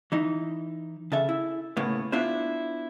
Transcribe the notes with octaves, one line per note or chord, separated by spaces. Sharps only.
E3 D#4
C#3 A4 E5
E4
A2 C#3 A#3 B3
B3 D4 E4 F4 C5